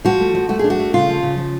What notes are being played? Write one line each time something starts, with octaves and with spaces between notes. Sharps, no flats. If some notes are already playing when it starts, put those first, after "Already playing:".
F3 F#4
A3
F3
A3 F#4
D4 G#4
F#4
A3
C#3 F4
F3
C#3
F3